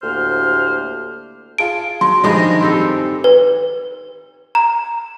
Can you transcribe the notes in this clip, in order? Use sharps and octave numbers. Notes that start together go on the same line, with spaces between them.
D2 A2 A#3 G4 C5 F6
F4 G#4 A5 D7
F#3 C6
G2 D3 D#3 F3 G#3 A#4
C4 G4 A4
B4
A#5